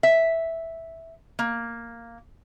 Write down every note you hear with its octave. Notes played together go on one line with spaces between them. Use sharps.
E5
A#3